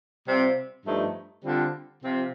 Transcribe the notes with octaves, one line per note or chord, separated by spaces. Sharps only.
C3 G3 C4 F4
G2 F3 A3 D#4
D3 G3 C4 F4
C3 F3 C4 F4